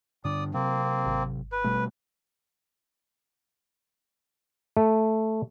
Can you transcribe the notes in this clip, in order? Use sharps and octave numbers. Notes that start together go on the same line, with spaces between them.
G2 D3 D4 D5 D#6
C3 F#3 A#3 C4
G#1
B4
B2 G3 A3
A3